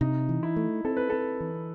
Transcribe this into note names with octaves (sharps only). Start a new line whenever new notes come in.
C3 D#4
E3
E4
A3
C4 A4
B4
C4 A4
E3